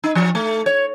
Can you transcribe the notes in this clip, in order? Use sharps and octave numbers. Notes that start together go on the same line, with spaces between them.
D#4
F3
A3
C#5